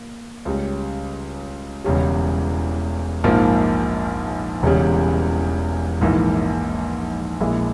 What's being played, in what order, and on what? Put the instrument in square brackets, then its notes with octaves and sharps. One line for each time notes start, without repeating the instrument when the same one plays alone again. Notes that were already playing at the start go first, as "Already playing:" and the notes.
Already playing: [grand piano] A#3
C#2 C#3 G3
E1 E2 C#3 G3
A#1 G#2 F3 A#3 F4
E1 E2 C#3 G3
A#1 G#2 E3 A#3 E4
A#1 A#2 G#3 E4